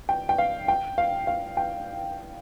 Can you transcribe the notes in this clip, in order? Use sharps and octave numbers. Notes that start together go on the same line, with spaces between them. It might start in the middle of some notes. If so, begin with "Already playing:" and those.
G5
G5
F5
G5
F5
F5
G5